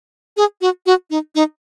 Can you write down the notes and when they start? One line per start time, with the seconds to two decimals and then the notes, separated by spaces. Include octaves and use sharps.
0.37 G#4
0.61 F#4
0.86 F#4
1.10 D#4
1.35 D#4